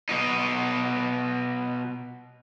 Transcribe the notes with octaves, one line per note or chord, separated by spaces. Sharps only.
B2 D#4